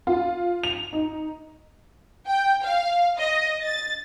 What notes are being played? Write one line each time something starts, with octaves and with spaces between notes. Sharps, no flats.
F4
F7
D#4
G5
F5
D#5
A6